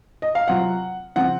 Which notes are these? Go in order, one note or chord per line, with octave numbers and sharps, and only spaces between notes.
D#5
F5
C3 F#3 C4 F4 F#5
C#3 F3 C4 F#5